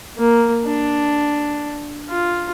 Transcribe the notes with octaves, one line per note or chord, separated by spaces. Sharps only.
A#3
D4
F4